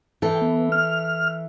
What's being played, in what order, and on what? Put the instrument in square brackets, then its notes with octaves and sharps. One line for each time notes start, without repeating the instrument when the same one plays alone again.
[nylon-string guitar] E3 A4 [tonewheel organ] G5
[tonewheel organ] B3
F6